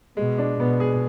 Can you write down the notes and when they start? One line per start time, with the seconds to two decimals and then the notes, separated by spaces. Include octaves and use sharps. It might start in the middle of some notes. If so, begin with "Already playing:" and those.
0.17 B2 G#3
0.38 D4
0.59 B2 B3
0.80 G#4